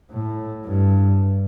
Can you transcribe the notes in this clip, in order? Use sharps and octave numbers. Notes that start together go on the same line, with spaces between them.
A2
G2